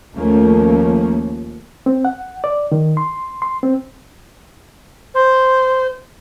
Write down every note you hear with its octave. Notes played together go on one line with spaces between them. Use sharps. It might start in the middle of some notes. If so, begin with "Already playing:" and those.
D#2 F3 A3 A#3 C#4
C4
F#5
D5
D#3
C6
C6
C4
C5